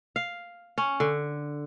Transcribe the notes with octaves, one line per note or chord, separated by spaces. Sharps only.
F5
C#4
D3